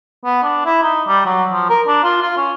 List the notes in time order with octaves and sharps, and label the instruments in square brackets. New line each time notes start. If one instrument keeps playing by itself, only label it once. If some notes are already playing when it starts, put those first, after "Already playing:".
[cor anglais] B3
D4
E4
D#4
G3
F#3
F3
A#4
D4
F4
F4
C#4